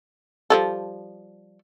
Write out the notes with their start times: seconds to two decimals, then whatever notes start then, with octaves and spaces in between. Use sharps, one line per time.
0.50 F3 G3 A4